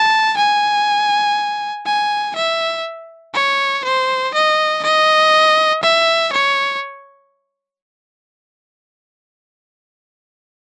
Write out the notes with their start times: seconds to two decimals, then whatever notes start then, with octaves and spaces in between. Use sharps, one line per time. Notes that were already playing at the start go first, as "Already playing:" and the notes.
Already playing: A5
0.37 G#5
1.85 G#5
2.35 E5
3.34 C#5
3.84 C5
4.34 D#5
4.83 D#5
5.83 E5
6.32 C#5